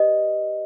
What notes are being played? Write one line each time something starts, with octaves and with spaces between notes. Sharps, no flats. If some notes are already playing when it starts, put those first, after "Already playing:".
Already playing: G4 B4 D5 D#5